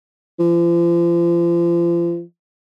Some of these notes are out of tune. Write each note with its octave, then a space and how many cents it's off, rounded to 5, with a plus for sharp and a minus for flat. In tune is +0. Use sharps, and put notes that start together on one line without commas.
F3 -35